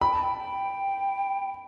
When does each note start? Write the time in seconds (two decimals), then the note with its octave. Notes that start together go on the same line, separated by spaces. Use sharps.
0.01 G5 B5
0.13 A5
0.23 G5
0.39 G5